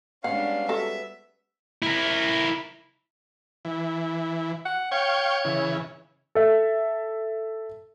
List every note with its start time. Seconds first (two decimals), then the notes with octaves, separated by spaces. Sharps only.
0.24 G3 G#3 B3 C#4 D4 F5 F#5
0.69 F#4 A4 E5
1.82 E4 A#4
3.65 E3
4.65 F#5
4.91 C#5 F5 G5 C#6
5.45 C#3 E3
6.35 A4 E5